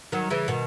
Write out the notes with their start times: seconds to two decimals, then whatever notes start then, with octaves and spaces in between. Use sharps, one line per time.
0.12 D#3 F#3
0.30 C#3 E3
0.48 B2 D#3